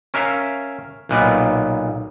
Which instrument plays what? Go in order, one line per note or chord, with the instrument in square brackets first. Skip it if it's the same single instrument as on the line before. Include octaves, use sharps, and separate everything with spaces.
[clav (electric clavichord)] C#4 A#4 E5 F5
B1 A#2 B3